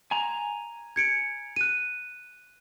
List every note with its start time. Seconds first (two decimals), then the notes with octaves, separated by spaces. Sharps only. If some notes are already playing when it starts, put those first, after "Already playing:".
0.11 G#5 A#5
0.96 G#6 C#7 D7
1.56 F#6 D#7